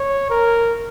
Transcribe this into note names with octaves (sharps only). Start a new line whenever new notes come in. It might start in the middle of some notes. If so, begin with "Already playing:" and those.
Already playing: C#5
A#4